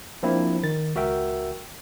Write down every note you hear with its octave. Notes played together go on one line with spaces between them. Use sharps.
F3 A#3 C4 D4 E4
D#3 A6
C#2 F#4 A#4 E5 G5